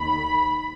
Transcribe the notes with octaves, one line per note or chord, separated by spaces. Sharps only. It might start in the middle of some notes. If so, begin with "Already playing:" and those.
Already playing: D#2 D#3 B5